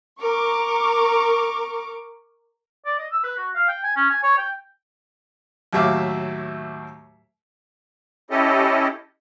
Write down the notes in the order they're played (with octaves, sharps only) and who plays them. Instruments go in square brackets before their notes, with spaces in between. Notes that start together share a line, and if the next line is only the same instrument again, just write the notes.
[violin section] A#4 C#6 D6
[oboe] D5
D#5
E6
B4
F#4
F5
G5
G#5
C#4
G#5
C#5
G5
[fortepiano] D#2 A2 F#3 E5 F5 D6
[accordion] C#4 E4 G4 A4 D#5